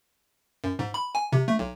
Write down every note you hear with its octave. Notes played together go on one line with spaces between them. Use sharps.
F#2
G#2
B5
G#5
C3
A3
B1